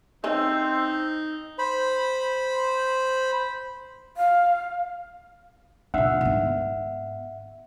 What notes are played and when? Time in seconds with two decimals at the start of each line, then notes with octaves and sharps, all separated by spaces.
0.24 D#3 E3 C4 C#4 D#4 C5 E6
1.58 C5 B5
4.17 F5
5.94 A#2 D4 E5 F#5
6.21 G#2 B3